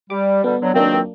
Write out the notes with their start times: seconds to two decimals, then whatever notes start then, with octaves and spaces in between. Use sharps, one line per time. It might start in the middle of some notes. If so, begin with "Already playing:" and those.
0.10 G3 D6
0.44 B2 D3 G3 B3
0.61 D3 F#3
0.74 C#2 D#3 F#3 A#3 C4 D4